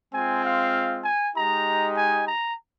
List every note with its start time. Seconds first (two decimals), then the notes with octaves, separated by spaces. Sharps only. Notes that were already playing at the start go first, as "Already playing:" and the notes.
0.13 G#3 C4 F4 G#5
0.44 F5
1.04 G#5
1.35 G#3 D#4 G4 A#5
1.97 G#5
2.27 A#5